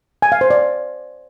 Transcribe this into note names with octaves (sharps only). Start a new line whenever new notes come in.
G#5
F5
C5
D5